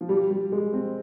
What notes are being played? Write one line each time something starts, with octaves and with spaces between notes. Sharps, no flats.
F3
G3
G3
G#3
C4